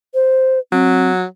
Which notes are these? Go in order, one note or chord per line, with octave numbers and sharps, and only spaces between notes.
C5
F#3 C4